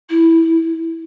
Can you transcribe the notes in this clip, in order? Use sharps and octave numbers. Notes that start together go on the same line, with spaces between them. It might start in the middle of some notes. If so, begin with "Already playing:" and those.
E4